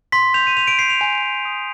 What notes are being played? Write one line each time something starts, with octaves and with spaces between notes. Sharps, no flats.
C6 B6
G6 F7
D#7
C6 F7
D7
G6 C7
F7
G#5
G#5
D#6